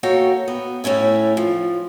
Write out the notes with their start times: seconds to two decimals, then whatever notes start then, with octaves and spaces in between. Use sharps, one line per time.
0.03 A#3 F#4 A4 C#5 G5
0.48 B3
0.84 A2 A3 C#4 E4
1.37 F3